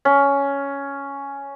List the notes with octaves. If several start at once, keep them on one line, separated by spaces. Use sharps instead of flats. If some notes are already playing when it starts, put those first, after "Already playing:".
C#4